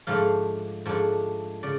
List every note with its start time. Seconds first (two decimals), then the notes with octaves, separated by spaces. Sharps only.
0.07 G#2 F3 A3 D4 F5
0.86 G#2 F3 A3 D4
1.63 C#3 D5